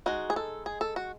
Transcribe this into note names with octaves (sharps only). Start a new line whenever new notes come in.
G#3 D#4 F#4
G#4
A4
G#4
A4
F#4